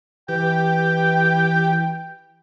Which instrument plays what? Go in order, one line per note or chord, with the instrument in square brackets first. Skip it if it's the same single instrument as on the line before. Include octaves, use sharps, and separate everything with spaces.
[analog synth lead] E3 [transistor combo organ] G4 [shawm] G5